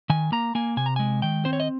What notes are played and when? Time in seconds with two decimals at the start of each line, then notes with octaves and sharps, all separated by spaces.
0.10 D#3 G#5
0.32 A#3 A#5
0.55 A#3 G#5
0.77 C3 G#5
0.86 A#5
0.96 G#3 G#5
1.22 D#3 G5
1.45 C4 C5
1.53 C#5
1.60 D#5